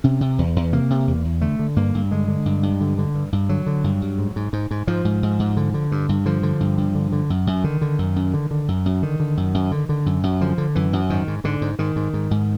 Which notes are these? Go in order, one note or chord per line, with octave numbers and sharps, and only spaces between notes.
C3 C#4
C3
E2
E2
C3 A#3
C3
E2
E2
D3 A3
D3
G2 A#3
G2
D3 G#3
D3
G2
G2
D3
D3
G2
G2
D3 F#3
D3
G2
G2
G#2
G#2
G#2
G#2
G#2 F3
G#2
G#2
G#2
D3
D3
G2
G2
D3 F3
D3
G2
G2
D3
D3
F#2
F#2
D3 D#3
D3
F#2
F#2
D3
D3
F#2
F#2
D3 D#3
D3
F#2
F#2
D3
D3
F#2
F#2
D3 F3
D3
F#2 E3
F#2
G#2 D#3
G#2
G#2 D3
G#2
G#2 D#3
G#2
G#2
G#2